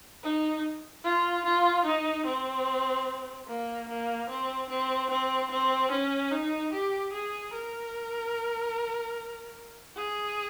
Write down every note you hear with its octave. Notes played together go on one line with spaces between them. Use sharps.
D#4
F4
F4
D#4
C4
A#3
A#3
C4
C4
C4
C4
C#4
D#4
G4
G#4
A#4
G#4